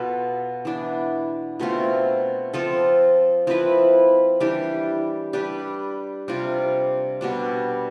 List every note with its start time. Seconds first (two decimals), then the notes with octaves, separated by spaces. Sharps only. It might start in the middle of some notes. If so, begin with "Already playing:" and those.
Already playing: B2 B3 F4 A4
0.65 E3 B3 D4
1.60 B2 A3 C4 F4
2.53 F3 C4 F4 A4
3.47 F3 C4 E4 B4
4.40 E3 G3 D4 G4
5.33 G3 D4 G4 B4
6.28 C3 G3 D4 F4
7.21 B2 G3 D4